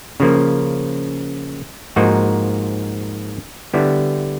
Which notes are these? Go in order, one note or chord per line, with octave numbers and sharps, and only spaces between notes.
C#3 F3 A#3
G#2 F3 A#3 D#4 F#4
D3 G3 B3 E4